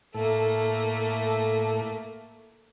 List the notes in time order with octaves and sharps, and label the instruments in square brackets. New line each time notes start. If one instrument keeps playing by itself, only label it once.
[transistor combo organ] A2 A4 [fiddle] A3 A#3